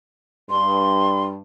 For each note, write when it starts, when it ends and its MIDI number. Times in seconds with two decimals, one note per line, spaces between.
0.50 1.39 43
0.50 1.22 84